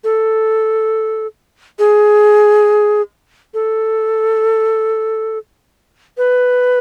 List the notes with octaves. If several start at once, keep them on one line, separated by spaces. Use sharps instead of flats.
A4
G#4
A4
B4